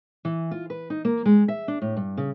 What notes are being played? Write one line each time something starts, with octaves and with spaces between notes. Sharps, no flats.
E3
F4
B4
D#4
A#3
G#3
E5
D4
A2
G2
C#3